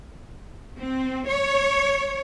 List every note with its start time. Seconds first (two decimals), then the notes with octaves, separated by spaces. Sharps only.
0.79 C4
1.27 C#5